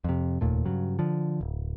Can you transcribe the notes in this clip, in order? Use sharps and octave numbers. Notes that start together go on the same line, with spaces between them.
F2 C3
F1 D#2 A#2 A3
G2 C#3 F#3
D3 F3
D1